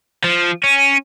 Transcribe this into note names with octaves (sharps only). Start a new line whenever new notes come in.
F3
C#4